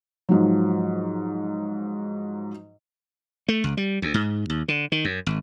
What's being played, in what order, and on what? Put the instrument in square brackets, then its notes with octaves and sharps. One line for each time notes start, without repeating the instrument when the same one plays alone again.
[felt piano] G#2 F3 F#3
[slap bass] A3
C#2
G3
D2
G#2
D#2
D3
D#3
F#2
G#1